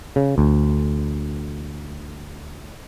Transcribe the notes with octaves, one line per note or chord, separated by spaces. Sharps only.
C#3
D2